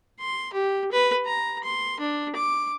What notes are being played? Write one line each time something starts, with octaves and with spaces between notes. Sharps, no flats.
C6
G4
B4
A#5
C6
D4
D6